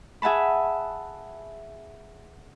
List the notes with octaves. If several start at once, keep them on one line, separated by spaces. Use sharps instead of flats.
G#4 E5 F#5 A5 B5